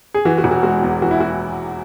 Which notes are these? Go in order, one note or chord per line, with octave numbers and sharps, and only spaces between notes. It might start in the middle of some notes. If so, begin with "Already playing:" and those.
G#4
E3 F#4
F#4
E1
F#4
G#3 F#4
E2
E3 F#4
E4
F#4